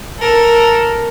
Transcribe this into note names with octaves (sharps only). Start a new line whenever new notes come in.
A4 A#4